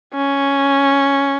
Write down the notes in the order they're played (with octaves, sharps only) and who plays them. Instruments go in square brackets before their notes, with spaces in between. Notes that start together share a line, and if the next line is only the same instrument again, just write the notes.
[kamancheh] C#4